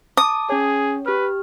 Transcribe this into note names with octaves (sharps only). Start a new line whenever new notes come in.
A5 D6 D#6
C#4 G#4 C#5
G4 B4 F6